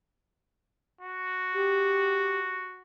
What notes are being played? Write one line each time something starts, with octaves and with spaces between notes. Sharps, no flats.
F#4
G4